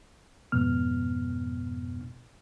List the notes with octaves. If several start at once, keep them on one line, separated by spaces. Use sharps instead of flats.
F2 G#2 B2 B3 F6